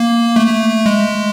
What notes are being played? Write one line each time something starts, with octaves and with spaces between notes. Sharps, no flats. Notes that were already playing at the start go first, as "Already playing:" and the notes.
Already playing: A#3
A3
G#3